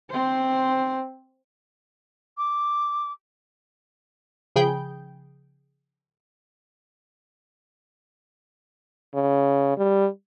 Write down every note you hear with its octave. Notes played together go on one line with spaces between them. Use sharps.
C4 C5
D6
C#3 F3 G#4 G5 B5 G6
C#3
G3